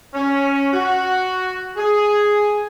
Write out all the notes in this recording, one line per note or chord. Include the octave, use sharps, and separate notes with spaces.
C#4
F#4
G#4